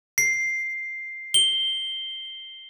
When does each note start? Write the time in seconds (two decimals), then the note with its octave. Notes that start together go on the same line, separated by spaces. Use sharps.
0.18 C7
1.34 G7